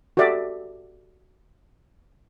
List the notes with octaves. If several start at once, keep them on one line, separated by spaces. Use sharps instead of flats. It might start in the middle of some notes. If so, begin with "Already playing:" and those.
F#4 G4 A4 D5 E5